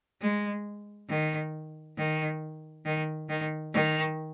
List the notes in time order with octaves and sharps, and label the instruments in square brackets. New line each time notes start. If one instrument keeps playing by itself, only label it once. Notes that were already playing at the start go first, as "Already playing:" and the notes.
[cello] G#3
D#3
D#3
D#3
D#3
D#3